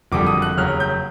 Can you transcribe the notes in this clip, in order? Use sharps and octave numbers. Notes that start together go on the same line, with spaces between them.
F#1 F2 D3 G3 D6
D#6
F#6
F1 D#2 C#3 F#3 F6
G6